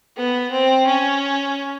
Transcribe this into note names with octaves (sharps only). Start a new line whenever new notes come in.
B3
C4
C#4